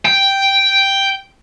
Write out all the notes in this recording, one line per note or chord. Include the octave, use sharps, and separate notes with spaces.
G5